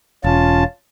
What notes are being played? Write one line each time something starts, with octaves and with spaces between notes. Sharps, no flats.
E1 C#4 F4 A5